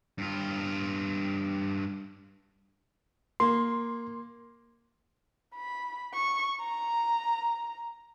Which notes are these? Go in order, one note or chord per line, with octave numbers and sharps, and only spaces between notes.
G2 F4
A#3 C6
B5
C#6
A#5